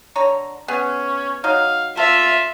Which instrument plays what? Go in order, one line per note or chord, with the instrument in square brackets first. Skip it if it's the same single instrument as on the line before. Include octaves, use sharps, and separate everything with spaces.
[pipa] D3 C#5 A#5
[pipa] B3 G#4 [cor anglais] C#4
[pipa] F#3 D#4 [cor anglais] F5
[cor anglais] F4 [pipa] A4 [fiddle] E5